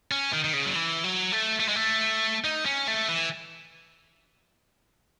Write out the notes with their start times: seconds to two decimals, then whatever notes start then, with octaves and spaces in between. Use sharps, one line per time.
0.11 C#4
0.32 D#3
0.44 D#3
0.53 C#3
0.66 F#3
0.75 E3
1.04 F#3
1.32 A3
1.60 A3
1.68 G#3
1.76 A3
2.45 D#4
2.66 C#4
2.88 A3
3.09 E3